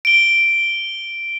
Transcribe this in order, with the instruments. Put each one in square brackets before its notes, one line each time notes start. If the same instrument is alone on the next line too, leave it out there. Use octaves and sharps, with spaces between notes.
[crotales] D7 G7